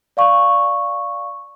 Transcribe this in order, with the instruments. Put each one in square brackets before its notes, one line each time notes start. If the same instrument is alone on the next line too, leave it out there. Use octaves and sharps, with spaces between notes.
[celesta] D5 F5 C#6